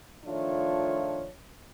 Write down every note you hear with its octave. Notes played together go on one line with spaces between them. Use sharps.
D#3 F3 A3 D4 F4 C#5